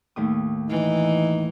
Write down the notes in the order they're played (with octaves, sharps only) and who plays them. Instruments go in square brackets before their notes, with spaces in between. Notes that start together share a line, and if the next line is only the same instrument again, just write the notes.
[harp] D#2 A2 D#6
[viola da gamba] E3 [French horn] D#4